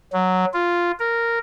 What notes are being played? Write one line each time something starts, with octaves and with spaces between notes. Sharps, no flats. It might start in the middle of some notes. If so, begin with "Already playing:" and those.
F#3
F4
A#4